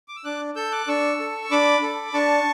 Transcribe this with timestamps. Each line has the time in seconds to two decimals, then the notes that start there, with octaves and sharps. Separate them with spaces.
0.08 D6
0.16 E6
0.24 D4 D6 F#6
0.56 A4 E6 G6
0.72 D6 F#6
0.88 D4 C#6 E6
1.20 A4
1.51 D4 B5 D6
1.83 A4
2.14 D4 A5 C#6